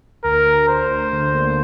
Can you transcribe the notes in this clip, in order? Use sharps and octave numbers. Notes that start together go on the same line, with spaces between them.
D2 A#4
D2
D2 C5
D2
D3
A#3